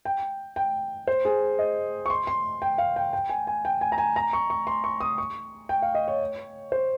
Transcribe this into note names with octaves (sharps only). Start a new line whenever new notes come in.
G5
G5
C5
G#4
D#5
C#6
C6
C6
G5
F5
G5
G5
G#5
G#5
G5
G#5
A#5
G#5
A#5
C#6
C#6
C6
C#6
D#6
C#6
G5
F5
D#5
C#5
C5